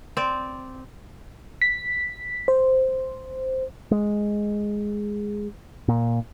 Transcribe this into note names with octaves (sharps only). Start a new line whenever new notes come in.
C4 D5
B6
C5
G#3
A#2